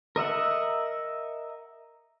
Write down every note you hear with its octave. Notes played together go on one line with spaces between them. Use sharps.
A#4 D#5 E5 F#5